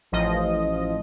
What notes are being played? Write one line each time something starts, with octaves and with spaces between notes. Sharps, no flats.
A1 F3 D#5